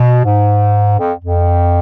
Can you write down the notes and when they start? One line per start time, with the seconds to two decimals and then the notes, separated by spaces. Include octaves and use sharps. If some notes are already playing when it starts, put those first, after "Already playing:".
Already playing: B2
0.25 G#2
0.99 F2
1.24 F2